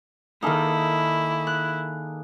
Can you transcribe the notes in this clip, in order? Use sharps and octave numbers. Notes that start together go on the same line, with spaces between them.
D#3 A#3 D#4 E4 G#4 A4
F#6